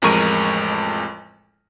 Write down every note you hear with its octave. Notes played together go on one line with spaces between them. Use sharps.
A1 F2 G#3 A#4 C#6 D#7